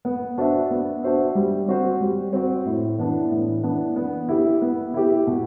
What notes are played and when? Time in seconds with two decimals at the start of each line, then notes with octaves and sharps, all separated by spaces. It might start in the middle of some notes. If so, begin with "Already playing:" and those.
0.05 B3
0.38 D4 F#4 C5 E5
0.70 B3
1.03 D4 F#4 C5 E5
1.35 G3
1.68 C4 F#4 C5
2.01 G3
2.33 C4 F#4 C5
2.65 A2
2.98 E3 B3 D4
3.31 A2
3.63 E3 B3 D4
3.96 B3
4.29 E4 G4
4.62 B3
4.94 E4 G4
5.27 B2